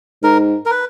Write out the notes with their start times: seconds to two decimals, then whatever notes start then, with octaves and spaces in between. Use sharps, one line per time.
0.23 G#2 A#4
0.66 A#4
0.71 B4